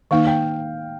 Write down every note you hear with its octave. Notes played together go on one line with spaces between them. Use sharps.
D#3 A#3 D#4 F5
G5